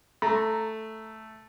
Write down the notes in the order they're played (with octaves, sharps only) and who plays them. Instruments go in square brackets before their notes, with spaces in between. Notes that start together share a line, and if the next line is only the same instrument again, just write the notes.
[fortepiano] A3 [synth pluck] A#5